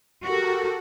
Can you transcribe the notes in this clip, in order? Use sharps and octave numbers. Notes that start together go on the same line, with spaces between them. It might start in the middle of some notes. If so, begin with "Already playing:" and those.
F#4 G4 A4 A#4